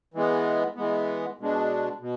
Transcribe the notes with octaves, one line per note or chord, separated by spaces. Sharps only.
E3 G#3 B3
E3 G#3 B3
B2 G#3 D4
B2